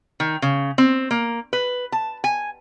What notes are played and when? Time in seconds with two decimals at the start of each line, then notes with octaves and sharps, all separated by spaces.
0.20 D#3
0.42 C#3
0.78 C4
1.11 A#3
1.53 B4
1.92 A5
2.24 G#5